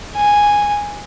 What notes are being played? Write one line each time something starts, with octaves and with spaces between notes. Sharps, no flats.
G#5